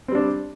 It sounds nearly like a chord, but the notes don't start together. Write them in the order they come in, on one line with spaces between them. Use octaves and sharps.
C4 G3 D4